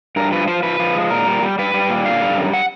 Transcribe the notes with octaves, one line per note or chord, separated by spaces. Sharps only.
G2 A#4
F3 B4
F3 C5
F3 B4
F3
G#3
A#2 A#4
G3
G3
G3 B4
G3
A#2
D3 F5
G3
F#2
F#5